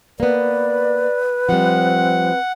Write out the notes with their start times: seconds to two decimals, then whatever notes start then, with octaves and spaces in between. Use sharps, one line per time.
0.20 A#3 B3 B4 D5
1.49 F3 G3 C4 F#5